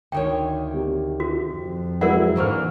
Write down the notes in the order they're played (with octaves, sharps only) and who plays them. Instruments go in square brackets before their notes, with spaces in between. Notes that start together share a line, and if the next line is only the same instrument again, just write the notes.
[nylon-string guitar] D2 D#3 C#5 [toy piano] G5
[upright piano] C3
[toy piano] F#4
[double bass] F2
[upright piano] F#3 G#3 [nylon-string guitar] E4 [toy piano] A#4 D5 F#5
[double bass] G#2 [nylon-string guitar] D3 E3 A#3 [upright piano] C5 C#6 F6